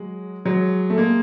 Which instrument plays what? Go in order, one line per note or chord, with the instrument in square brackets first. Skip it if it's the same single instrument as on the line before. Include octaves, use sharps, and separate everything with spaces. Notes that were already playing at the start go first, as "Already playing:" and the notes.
Already playing: [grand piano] F#3 G#3
F#3 G#3
A3
G#3 A#3